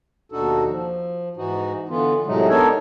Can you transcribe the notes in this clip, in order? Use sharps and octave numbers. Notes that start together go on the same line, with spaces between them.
D#2 B2 D4 D#4 F#4 A4
F3
G#2 E3 D#4 F#4
D3 E3 B3 F4
A2 C3 F#3 G#3 A3 D#4
B3 D4 D#4 A4 A#4 C#5